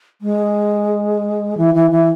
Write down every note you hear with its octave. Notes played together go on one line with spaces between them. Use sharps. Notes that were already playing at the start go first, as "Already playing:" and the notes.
G#3
E3
E3
E3